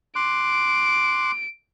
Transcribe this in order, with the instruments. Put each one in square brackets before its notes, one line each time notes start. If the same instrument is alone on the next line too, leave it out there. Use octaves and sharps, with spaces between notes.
[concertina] C6 D6 F#6 [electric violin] D7